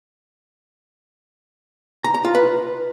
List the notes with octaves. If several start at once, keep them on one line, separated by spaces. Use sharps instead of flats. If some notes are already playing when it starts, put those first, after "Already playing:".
A#5
A#5
F4
B4